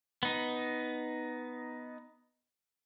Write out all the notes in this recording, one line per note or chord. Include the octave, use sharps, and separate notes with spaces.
B3 D#4